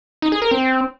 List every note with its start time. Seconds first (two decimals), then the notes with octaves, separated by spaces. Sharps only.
0.22 D#4
0.32 G#4
0.42 A#4
0.51 C4